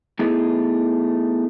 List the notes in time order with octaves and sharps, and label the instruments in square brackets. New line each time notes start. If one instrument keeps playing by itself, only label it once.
[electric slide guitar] A3 B3 D#4 E4 G#4